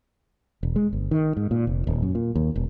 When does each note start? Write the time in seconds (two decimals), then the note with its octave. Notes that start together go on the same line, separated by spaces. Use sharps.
0.63 E1
0.76 G#3
0.93 G1
1.11 D#3
1.37 G#2
1.51 A#2
1.67 F1
1.87 D#1
2.02 F#2
2.15 A#2
2.35 D#2
2.56 E1